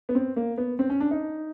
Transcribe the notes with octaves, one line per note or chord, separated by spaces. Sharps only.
B3
C4
A#3
B3
C4
C#4
D4
D#4